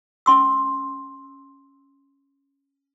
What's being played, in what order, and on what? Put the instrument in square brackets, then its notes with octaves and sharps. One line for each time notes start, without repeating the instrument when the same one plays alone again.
[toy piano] C#4 C6 E6